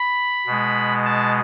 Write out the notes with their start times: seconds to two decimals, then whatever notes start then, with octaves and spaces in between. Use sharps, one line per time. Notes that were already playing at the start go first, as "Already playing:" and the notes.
Already playing: B5
0.46 B2 G#3
1.06 A5